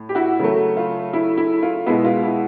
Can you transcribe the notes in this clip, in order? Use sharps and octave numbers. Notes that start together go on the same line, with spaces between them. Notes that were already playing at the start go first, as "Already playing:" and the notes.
Already playing: A2
G4
E4 F#4
C#3 F#3 A3
F4
E4
E4
F4
B2 G#3 B3 E4
F4
E4